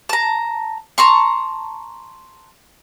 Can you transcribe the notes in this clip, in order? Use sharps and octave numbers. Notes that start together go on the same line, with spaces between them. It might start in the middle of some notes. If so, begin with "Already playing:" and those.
A5 A#5
A5 A#5 C6 C#6